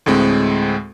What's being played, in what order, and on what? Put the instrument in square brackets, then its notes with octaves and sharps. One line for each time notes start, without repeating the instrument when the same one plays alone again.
[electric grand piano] D2 A2 G#3 C4